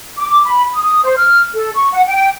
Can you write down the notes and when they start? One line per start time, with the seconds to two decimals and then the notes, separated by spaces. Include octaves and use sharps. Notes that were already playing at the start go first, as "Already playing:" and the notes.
0.17 D6
0.45 B5
0.74 D#6
1.04 C5
1.17 F6
1.55 A4
1.75 C#6
1.92 F#5
2.06 G5